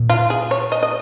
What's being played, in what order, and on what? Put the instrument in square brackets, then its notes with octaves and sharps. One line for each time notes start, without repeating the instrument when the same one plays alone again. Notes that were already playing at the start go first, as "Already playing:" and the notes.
Already playing: [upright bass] A#2
[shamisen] F4
G#4
C#5
D#5
D#5